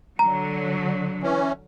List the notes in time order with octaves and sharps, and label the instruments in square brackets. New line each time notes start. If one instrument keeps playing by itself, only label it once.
[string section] D3 F#3 [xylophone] A#5
[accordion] E3 C#4